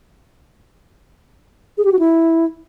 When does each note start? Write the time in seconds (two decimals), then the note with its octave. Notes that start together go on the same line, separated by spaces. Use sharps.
1.78 G#4
1.85 G4
1.92 F#4
1.99 E4